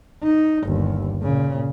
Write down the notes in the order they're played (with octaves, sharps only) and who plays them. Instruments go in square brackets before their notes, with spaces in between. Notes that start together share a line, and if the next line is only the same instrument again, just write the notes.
[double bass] D#4
G1 D#2
A#2 C#3